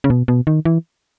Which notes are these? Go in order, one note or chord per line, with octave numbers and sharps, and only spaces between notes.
C#3
B2
B2
D#3
E3